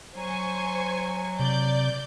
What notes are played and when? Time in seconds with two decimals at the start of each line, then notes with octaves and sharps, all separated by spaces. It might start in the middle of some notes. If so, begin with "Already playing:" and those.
0.16 F#3 C5 G#5 C#6
1.39 C3 D5 G6